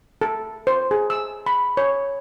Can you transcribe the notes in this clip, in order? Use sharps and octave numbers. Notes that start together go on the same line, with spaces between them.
A4
C5
G#4
E6
B5
C#5